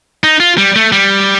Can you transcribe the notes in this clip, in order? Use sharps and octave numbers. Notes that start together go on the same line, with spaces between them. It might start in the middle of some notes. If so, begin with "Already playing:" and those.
D#4
F4
G3
A3
G3